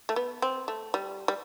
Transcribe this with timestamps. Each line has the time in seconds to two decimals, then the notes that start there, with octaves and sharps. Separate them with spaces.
0.09 A3
0.16 B3
0.42 C4
0.68 A3
0.94 G3
1.28 G3